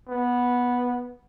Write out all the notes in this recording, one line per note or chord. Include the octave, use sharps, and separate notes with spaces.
B3